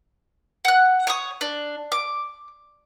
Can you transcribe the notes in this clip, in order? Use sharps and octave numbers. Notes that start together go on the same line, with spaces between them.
F#5 F#6
C#5 C#6 D#6
D4
D6